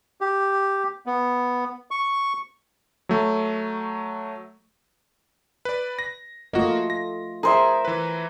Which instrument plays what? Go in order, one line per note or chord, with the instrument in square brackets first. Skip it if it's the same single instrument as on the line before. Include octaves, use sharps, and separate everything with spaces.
[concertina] G4
B3
C#6
[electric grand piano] F#3 A3
B4 D5
A#6
[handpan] A3 F4 D#5 [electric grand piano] A#3 F#4
[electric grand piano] A#6
[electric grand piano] G#4 [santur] A#4 C5 E5
[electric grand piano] E3 B4